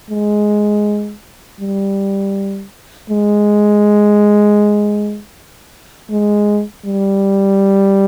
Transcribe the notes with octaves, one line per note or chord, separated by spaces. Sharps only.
G#3
G3
G#3
G#3
G3